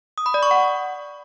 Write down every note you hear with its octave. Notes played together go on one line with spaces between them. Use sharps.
D#6
B5
D5
C#6
F#5